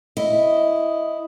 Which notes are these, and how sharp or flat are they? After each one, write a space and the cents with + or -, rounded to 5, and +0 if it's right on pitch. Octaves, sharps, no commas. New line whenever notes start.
E4 +0 D#5 +0